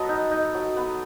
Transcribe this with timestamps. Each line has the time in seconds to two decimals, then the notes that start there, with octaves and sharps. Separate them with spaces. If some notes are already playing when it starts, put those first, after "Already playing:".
Already playing: F#3 B3 A4 B4 D#5
0.09 D#4
0.31 D#4
0.54 F#3
0.76 B3